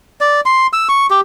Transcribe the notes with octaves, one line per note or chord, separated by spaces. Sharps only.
D5
C6
E6
C#6
G4